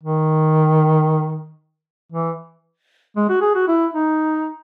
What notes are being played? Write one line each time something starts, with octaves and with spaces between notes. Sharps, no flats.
D#3
E3
G#3
F#4
G#4
F#4
E4
D#4